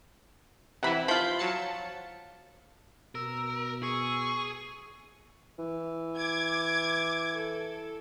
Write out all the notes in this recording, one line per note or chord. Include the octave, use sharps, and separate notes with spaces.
C3 E3 E4 F#5 B5
F3 F4 B5 G6
F#3 A5 C#7
B2 A#4 E6
G#4 C#6
E3
D6 G#6
A4